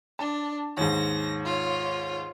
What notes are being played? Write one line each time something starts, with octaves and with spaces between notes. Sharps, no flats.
D4 A5
D#2 G#2 A#6
F4 C#5